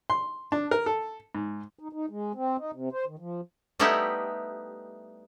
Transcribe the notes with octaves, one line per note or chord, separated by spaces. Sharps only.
C6
D4
A#4
A4
G#2
D#4
D#4
G#3
C4
D#4
C3
C5
D#3
F3
G3 A3 B3 D#4 E4 G4